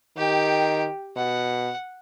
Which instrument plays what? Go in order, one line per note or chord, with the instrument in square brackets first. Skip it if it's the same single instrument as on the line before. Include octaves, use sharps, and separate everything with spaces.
[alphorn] D#3 [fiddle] G4 G5
[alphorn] B2 [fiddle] F#5